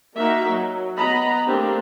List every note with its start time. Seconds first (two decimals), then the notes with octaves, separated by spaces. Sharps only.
0.18 A#3 D#4 F#4 A#4 E5
0.50 F#3
0.97 B3 D#5 A#5 B5
1.48 A3 A#3 C4 D4 G4